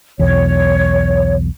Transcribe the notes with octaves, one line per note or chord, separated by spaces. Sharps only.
B1 E2 C#5